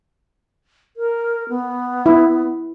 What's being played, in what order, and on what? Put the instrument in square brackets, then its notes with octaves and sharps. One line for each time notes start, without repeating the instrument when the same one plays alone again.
[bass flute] A#4
B3
[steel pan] E4